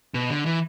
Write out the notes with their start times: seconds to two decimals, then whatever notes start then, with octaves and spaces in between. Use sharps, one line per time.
0.14 B2
0.30 D3
0.46 E3